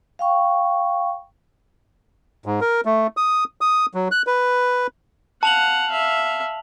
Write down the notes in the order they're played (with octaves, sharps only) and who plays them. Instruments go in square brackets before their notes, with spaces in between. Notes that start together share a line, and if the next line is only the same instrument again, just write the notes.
[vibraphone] F5 G5 C#6
[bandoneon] G#2
A#4
A3
D#6
D#6
F#3
F#6
B4
[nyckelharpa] F5 F#5 [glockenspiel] A5 F7 F#7
[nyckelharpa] E5 F5